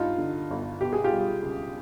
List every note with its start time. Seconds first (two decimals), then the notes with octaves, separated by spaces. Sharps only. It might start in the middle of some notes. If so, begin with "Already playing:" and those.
Already playing: G2 D#4 F4
0.18 D3
0.50 G1
0.81 B2 G4
0.93 G#4
1.04 F4 G4
1.12 G3
1.43 C#2